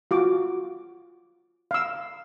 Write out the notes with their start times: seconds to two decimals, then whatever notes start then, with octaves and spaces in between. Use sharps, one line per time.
0.11 F4 F#4 D6
1.71 F5 E6